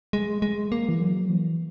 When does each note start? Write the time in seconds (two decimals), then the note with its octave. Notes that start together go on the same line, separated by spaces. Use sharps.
0.13 G#3
0.42 G#3
0.72 A#3
0.89 E3
1.01 F#3
1.29 E3